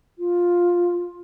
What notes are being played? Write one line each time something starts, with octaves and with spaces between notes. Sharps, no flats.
F4